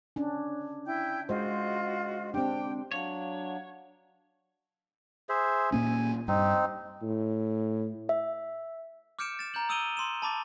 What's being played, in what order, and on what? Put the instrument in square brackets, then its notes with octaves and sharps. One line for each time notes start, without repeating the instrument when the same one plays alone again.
[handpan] C#4 D4
[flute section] E4 G5 G6
[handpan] G#3 C5 [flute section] F4 F#4 D#5
[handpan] C4 D4 [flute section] G4 G5
[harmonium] F#3 D4 [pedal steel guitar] C#5 [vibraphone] F5 F#5
[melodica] G#4 C5 E5
[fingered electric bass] A#2 A#3 C#4 [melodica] G#5
[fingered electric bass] G2 [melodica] C4 D#4
[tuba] A2
[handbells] E5
[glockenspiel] D6 F6 G6 C#7 D7 E7
A6 E7
A#5 F6 G6 F#7
D#6 E6 D7 D#7 F7 G7
C6 E7
A5 B5 D6 A6